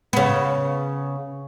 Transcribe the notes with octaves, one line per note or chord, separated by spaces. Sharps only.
C#3 B3